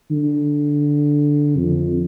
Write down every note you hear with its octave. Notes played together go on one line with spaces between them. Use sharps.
D3
F2